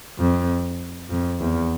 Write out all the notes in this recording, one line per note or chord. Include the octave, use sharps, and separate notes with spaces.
F2
F2
E2